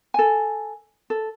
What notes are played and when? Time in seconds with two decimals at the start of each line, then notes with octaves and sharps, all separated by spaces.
0.14 A4 G#5
1.10 A4